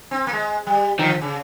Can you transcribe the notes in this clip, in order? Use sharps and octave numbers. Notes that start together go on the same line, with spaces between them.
C4
A#3
G#3
G3
D#3 F3
C#3